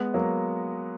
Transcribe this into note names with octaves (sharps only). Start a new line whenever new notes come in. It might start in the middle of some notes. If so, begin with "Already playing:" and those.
Already playing: G#3 B3
F#3 A#3